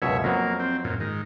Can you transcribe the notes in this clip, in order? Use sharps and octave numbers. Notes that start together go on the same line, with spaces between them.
C#2 F#2 B2 C#5 E5
F2 F#3 A#3 B3
C4
F#2 A#2
G#2 D#3